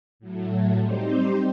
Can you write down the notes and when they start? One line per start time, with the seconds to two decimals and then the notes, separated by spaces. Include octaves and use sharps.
0.19 A2 F#3 A3
0.77 G3 C4 D#4 G4 C5